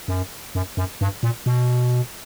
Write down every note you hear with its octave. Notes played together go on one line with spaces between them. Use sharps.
F#2
F#2
F#2
G2
A#2
B2